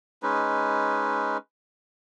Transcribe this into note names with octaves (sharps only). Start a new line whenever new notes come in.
G#3 C#4 D#4 B4